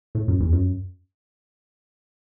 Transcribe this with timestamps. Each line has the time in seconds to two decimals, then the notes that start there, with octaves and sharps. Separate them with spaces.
0.15 A2
0.28 F#2
0.40 E2
0.53 F#2